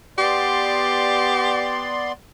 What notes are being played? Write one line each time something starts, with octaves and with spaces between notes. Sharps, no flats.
B3 G4 D5 C6